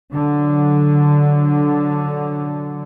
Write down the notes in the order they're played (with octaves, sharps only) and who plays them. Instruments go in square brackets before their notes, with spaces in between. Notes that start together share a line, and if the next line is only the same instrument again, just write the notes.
[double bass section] D3 F#3